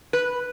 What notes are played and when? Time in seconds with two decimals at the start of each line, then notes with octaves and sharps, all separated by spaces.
0.13 B4